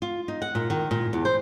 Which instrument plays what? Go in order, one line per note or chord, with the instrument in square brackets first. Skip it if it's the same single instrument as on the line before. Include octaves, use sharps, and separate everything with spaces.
[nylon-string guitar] F4
D#4
F#5
A#2
D#3
A#2
E2
C5